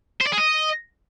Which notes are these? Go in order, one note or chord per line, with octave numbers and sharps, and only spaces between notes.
C5
D5
G#4
D#5